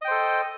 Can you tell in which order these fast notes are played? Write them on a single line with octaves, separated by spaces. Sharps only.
D#5 G5 C5 A4